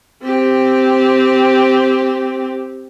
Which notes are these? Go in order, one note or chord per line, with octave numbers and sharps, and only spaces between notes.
C4 G4